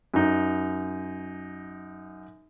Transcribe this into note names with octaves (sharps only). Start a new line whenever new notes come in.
F#2 D#4